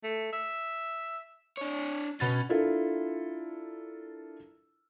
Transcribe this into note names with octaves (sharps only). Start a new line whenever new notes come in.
A3
E5
D4 C#5
B2 C#4 A6
D4 E4 F4 A4 A#4